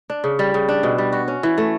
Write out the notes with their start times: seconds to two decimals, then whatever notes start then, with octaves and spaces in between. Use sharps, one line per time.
0.10 D4
0.24 C#3
0.39 G3
0.54 C#3
0.69 D4
0.83 B2
0.98 G3
1.13 F#4
1.28 C#4
1.43 E3
1.58 A3